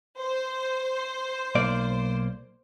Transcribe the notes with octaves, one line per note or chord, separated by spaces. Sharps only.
C5
B1 A#3 D5